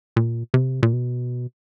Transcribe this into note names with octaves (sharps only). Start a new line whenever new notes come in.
A#2
C3
A#2
B2